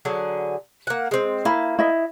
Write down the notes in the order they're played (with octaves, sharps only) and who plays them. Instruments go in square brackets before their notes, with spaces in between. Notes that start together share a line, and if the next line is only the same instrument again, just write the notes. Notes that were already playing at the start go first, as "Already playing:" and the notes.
[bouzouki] D3 F#3 G#4
A#3 F#5
G#3 C4
[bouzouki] A#3 [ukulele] E4 B5
[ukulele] E4 D#5